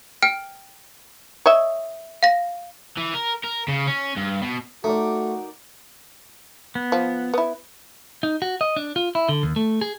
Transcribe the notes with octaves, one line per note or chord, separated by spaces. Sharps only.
G5 F6 D7
C#5 D#5 E5
F5 A#6
E3
A#4
A#4
C#3
C#4
G2
B2
A3 D#4 F#4 A#4 D5
B3
F3
B3 E4
D#4
F#4
D#5
D4
F4
E4
D3
D#2
A3
G#4